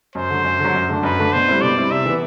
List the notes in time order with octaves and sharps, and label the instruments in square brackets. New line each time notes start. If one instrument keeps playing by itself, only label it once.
[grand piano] F#2 [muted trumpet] C5
[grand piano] D3 F#3
F#2
D3
F#3
F#2
D3 A3 D4
[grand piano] F#2 [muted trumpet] B4
[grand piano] D3 A3 D4
[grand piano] B2 [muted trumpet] C5
[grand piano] G3 C4 E4
[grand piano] B2 [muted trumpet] D5
[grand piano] G3 C4 E4
[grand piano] C3 [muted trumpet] E5
[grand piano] E3 B3